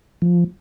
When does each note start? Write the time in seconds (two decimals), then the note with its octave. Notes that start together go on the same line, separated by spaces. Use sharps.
0.22 F3